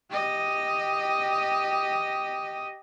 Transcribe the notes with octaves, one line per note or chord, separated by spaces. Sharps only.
G4 D#5